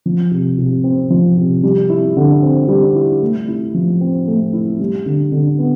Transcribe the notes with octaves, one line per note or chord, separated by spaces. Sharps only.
F3
C3
C3
C4
F3
C3
G3
E4
D3
C4
G3
E4
A3
E4
F3
C4
A3
E4
G3
D3
D3
B3